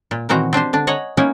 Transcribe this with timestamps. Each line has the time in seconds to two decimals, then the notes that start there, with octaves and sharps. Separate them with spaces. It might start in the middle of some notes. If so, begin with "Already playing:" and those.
0.11 A#2
0.29 A#2 D#3 E3 C4 F#4 A#5
0.53 C4 D4 G4 C5
0.73 D3 D4
0.87 C#5 D#5 F#5 G#5 A#5
1.17 A#3 B3 C#4 D#4 E4 A#4